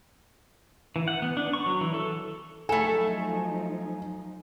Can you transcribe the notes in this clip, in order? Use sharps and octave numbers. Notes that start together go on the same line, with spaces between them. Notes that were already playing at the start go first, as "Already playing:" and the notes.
E3
F#5
B3
D4
C#6
F#3
E3
A4
F3 F#3 A3 D#4 A4 G#5